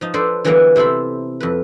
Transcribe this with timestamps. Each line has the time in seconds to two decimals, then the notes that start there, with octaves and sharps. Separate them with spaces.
0.01 F3 D#4
0.14 D4 A4 B4 C5
0.45 D3 E3 F#3 G3 A#3 B3
0.76 C3 E4 A4 C5 B5
1.40 F2 B4